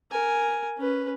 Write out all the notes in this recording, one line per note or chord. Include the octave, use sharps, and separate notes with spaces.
A#4 G#5
C#4 B4